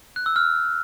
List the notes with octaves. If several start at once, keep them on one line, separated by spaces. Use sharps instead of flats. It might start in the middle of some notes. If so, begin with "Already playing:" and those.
F#6
E6
F6